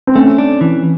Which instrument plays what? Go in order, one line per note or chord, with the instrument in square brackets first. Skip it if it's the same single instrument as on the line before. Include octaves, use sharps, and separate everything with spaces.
[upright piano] C4
[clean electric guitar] A3 [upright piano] C#4
[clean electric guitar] D4
E3